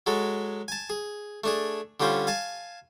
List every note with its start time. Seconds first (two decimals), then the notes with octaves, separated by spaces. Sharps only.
0.06 F#3 G#3 A4
0.68 G#5 A5
0.90 G#4
1.44 A3 D4 G#4
2.00 D3 G3 C#4 F4 C5
2.27 F5 G#5 A5